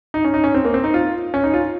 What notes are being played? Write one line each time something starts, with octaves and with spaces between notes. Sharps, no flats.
D#4
C#4
D#4
C#4
C4
A#3
C4
D#4
F4
C#4
D#4
F4